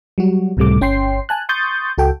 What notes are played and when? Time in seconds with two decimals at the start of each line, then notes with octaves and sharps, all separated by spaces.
0.18 F#3 G3 F#4
0.57 C#2 A2 C3 G3 A3 D6
0.81 G1 C#4 G5 C6 C7
1.29 G#5 A5 F#6
1.49 C6 C#6 D#6 G6 A6
1.98 C#2 F#4 A4 G5